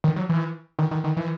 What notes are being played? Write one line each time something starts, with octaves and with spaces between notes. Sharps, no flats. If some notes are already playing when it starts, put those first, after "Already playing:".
D#3
F#3
E3
D#3
D#3
D#3
E3